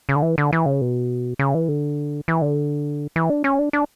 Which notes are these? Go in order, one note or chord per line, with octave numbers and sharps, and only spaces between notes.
C#3
D3
E3
D3
E3
C#3
B2
C#3
E3
D3
E3
D3
E3
D4
C#4
D4
D4